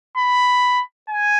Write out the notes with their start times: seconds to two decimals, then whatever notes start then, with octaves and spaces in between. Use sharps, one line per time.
0.17 B5
1.10 G#5